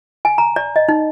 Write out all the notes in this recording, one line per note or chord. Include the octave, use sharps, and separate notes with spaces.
G#5
A#5
D5
D#5
D#4